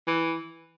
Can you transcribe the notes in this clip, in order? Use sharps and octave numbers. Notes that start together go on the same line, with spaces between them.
E3